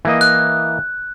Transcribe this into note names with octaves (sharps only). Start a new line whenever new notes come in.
E3 A#3 D#5
F#6